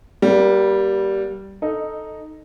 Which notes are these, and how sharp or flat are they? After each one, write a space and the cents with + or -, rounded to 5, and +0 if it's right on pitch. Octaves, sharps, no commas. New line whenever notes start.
G3 -10 A#3 +30
D#4 +0 A4 +0